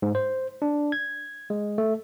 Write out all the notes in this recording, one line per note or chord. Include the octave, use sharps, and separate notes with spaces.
G#2
C5
D4
G#6
G#3
A3